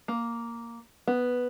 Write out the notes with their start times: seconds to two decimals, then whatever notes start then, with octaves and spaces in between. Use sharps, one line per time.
0.08 A#3
1.07 B3